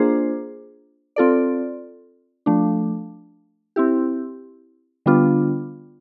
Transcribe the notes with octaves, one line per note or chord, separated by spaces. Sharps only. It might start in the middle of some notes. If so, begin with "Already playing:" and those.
Already playing: A#3 D4 F4 G#4 C5
C4 F4 A4 D5
F3 A3 D4
C4 E4 G4
D3 G3 B3 D4 F4